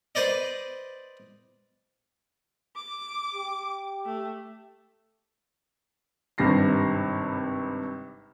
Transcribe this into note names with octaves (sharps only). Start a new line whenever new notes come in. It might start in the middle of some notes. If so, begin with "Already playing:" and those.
B4 C5 D5 D#5
D6
G4
A3
G#1 G2 C3 A#6 C7